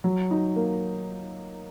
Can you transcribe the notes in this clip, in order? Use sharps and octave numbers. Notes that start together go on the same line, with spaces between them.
F#3
D#4
A#3